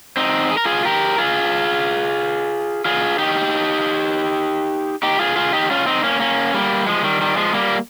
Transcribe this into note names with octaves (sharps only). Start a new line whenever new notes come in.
C4 D#4
G#4
A#4
F4 G#4
G4 A#4
F4 G#4
F4 G#4
D#4 G4
D#4 G4
F4 G#4
F4 G#4
D#4 G4
C#4 F4
C4 D#4
A#3 C#4
A#3 C#4
G3 A#3
F3 G#3
D#3 G3
D#3 G3
F3 G#3
G3 A#3